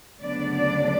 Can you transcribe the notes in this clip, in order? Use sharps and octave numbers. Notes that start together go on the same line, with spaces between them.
D2 C#3 F#3 B3 D4 D5
D5